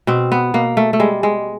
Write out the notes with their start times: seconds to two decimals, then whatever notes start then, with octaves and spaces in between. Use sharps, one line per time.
0.07 B2 C4
0.32 B3
0.54 B2 A#3
0.77 A3
0.93 A3
0.99 G3 G#3
1.23 G#3